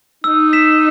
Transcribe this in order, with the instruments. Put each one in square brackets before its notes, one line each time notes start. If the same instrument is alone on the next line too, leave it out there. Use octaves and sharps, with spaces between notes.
[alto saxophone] D#4 [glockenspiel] E6
[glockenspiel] B6 E7